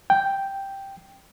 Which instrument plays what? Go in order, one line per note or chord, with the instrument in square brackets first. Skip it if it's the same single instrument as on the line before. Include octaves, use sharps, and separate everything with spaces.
[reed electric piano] G5